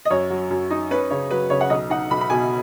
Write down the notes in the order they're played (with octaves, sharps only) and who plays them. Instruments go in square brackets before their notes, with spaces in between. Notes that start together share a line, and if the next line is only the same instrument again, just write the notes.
[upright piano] D#5
F#2 C#5
F#3
F#2
D#4
C#4 B4
C#3 C#5
F#3 B4
C#3 C#5
F#5
B1 D#5
D#4 F#5
B1 B5
B5
B2 G#5